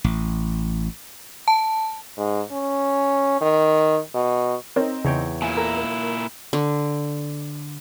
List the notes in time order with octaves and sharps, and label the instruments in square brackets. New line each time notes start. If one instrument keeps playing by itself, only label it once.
[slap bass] A1
[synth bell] A5
[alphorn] G#2
C#4
D#3
B2
[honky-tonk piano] C4 D#4 [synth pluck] A#4 C#5
[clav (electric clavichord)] E2 C#5 G5 [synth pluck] C#3
[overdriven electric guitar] A#2 E4 [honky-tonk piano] G#5
[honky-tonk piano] A4 A#4 A#5
A#3
[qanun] D3